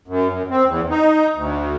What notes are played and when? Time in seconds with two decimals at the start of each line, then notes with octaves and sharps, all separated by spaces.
0.08 F#2
0.30 F#2
0.50 C4
0.67 E2
0.90 D#4
1.36 D2